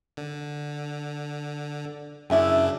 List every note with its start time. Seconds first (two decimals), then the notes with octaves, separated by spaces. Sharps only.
0.17 D3
2.30 F#2 C#3 D4 E4 E5 G#5